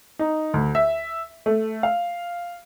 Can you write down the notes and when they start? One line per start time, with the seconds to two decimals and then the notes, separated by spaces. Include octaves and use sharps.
0.19 D#4
0.54 D2
0.75 E5
1.46 A3
1.83 F5